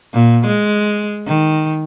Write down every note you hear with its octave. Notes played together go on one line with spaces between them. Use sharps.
A#2
G#3
D#3